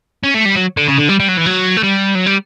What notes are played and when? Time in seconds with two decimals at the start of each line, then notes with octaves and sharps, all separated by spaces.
0.24 C#4
0.34 A3
0.45 G3
0.56 F#3
0.77 D3
0.88 C#3
0.98 D3
1.09 G3
1.20 G3
1.28 F#3
1.37 E3
1.46 F#3
1.77 A3
1.83 G3
2.15 F#3
2.26 G3